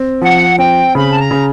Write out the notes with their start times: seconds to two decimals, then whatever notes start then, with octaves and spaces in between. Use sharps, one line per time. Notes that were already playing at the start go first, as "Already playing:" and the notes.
Already playing: C4
0.22 F3 F#5
0.58 C4 G5
0.95 C#3 B5
1.11 A5
1.18 A#5
1.31 C#3